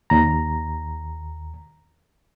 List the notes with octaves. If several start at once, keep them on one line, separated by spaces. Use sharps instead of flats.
D#2 A#5